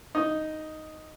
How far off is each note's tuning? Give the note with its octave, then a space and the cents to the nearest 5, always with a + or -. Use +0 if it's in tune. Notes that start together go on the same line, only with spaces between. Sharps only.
D#4 +0 D#5 +0